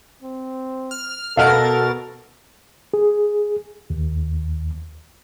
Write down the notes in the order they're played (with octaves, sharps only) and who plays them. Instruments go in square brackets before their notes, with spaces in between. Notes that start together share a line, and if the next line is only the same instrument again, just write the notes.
[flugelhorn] C4
[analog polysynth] F6
[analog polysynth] B2 A#4 A6 [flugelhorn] A4 [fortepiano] F5 F#5 F6
[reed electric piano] G#4
D#2